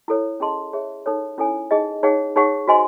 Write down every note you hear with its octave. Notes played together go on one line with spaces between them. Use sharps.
E4 A4 C#5
C#4 G#4 D#5 A5 C6
G#4 C#5 E5
D#4 A4 C#5
C#4 E4 A4 C#5 G#5
D#4 G#4 D#5
D#4 G#4 C#5 F#5
D#4 G#4 C#5 F#5 C#6
F#4 C5 D#5 G#5 C6